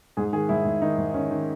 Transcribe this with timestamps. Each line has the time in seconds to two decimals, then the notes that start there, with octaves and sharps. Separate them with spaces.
0.17 G#2 G#4
0.33 D#3 G#4
0.49 G#2 E4
0.65 G#2
0.82 D#3 D#4
0.98 G#2
1.14 D#3 C#4
1.31 D#3